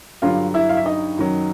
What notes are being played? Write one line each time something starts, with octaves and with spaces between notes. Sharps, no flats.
G2 D3 F#3 F4 F5
E4 E5
F5
E5
D#4 D#5
F#2 D#3 F#3